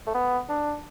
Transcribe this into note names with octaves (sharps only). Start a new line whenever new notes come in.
A3
B3
D4